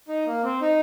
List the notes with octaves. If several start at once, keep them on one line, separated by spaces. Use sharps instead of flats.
D#4
A#3
C4
D#4